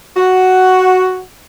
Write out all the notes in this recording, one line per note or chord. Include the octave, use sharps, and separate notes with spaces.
F#4